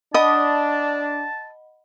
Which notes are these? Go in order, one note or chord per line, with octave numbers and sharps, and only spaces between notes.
D4 D#5 F#5 A5 B5 D#6